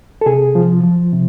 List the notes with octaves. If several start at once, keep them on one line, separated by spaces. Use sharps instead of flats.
A4
C3 G#4
F3
F3
C3